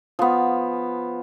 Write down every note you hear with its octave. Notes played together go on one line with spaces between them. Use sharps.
F3 B3